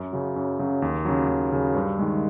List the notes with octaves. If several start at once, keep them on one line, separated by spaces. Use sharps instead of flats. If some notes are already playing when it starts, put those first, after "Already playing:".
Already playing: F#2
C#3 F#3
F#2
C#3 F#3
D#2
C#3 F#3
D#2
C#3 F#3
G2
D#3 G#3